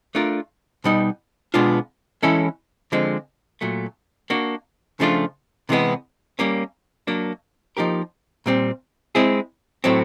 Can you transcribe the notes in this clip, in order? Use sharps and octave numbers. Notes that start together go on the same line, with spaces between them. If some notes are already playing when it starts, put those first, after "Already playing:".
A3 D4 F4 A#4
B2 G3 B3 D#4
B2 G#3 B3 D4 F4
E3 G#3 C#4 E4 A4
D3 F3 G#3 C4
A#2 F#3 A3
A#3 D4 F#4
C#3 F3 A3 D4 F4
C3 E3 G#3 B3
G3 A#3 C#4
F#3 A#3 D4
F3 A#3 D#4 G4 A#4
A#2 G3 C4
G#3 C4 E4 G#4
A2 F#3 A3 C4